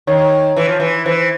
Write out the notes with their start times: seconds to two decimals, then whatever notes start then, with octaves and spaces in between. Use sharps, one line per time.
0.07 D#3 C#5
0.56 E3
0.68 F3
0.80 E3
1.06 E3 C5